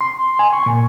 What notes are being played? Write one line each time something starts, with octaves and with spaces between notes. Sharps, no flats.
C6
G#5
C#6
A#2